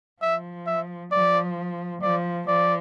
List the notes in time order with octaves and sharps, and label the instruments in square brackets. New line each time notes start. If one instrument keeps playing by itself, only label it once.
[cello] F3 [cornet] E5
[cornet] E5
[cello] F3 [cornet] D5
[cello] F3 [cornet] D5
[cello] F3 [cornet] D5